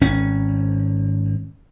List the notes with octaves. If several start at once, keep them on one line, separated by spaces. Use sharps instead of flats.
G#1 C#4